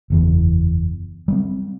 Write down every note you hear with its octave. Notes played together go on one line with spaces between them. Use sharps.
F#1 E2 E3
G3 A#3 C4